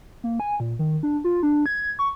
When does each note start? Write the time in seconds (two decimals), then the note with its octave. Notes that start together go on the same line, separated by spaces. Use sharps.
0.24 A#3
0.40 G#5
0.60 A#2
0.79 D#3
1.03 D4
1.24 F4
1.43 D4
1.66 G#6
1.99 C#6